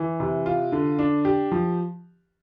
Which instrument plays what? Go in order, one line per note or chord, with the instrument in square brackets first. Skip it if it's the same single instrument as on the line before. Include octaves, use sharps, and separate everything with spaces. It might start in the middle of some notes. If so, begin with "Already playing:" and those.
Already playing: [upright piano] E3
C3
F4
D3
D4
G4
F3